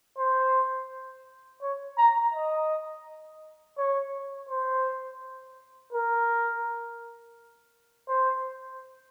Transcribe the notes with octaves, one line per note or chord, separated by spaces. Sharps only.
C5
C#5
A#5
D#5
C#5
C5
A#4
C5